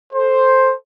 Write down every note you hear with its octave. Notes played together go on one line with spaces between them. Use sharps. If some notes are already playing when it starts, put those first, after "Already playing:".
A4 C5